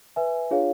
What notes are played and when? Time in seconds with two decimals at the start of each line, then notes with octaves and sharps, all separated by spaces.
0.16 B4 E5 G#5
0.50 D4 F4 G#4 C#5 F5